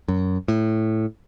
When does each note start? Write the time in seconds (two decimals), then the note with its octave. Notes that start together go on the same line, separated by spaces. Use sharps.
0.08 F#2
0.48 A2